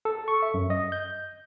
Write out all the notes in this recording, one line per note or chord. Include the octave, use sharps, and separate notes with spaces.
A4
C#6
E5
F#2
D#5
G6